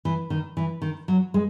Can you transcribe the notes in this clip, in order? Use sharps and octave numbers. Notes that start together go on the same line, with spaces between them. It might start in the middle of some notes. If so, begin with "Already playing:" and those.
E3
D#3
E3
D#3
F#3
G#3